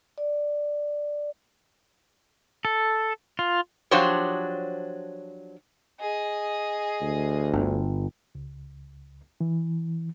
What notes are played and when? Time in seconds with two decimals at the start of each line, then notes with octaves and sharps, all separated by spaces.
0.18 D5
2.65 A4
3.39 F4
3.91 F3 F#3 D4 G4 C5 C#5
6.00 G#4 D#5
7.01 D2
7.53 G1
8.35 C#2
9.41 E3